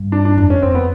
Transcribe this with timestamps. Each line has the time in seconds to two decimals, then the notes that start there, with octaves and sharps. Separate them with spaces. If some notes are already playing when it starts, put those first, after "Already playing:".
Already playing: G2
0.12 D4
0.25 D4
0.38 F2 D4
0.50 C#4
0.62 F2 C4
0.75 B3